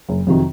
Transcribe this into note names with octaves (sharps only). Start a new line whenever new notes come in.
F#1
F2 C3 D#3 F#3